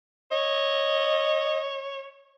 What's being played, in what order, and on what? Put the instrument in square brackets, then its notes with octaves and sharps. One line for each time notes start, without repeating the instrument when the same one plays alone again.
[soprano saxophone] C#5 [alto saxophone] D#5